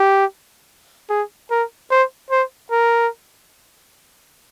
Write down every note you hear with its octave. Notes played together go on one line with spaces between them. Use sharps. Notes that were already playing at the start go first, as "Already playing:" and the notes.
Already playing: G4
G#4
A#4
C5
C5
A#4